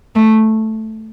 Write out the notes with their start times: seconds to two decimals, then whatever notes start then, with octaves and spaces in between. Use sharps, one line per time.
0.15 A3